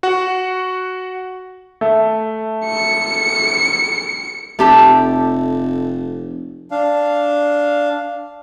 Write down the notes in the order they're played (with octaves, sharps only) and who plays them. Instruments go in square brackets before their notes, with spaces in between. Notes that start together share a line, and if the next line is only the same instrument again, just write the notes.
[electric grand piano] F#4 F#5
[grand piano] A3
[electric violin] C#7
[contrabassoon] F1 [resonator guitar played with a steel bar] A3 G4 A5
[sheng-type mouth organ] D4 F5